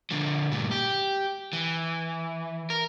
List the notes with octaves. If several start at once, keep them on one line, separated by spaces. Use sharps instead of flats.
D3 F3
G2 A#2
G4
E3
A#4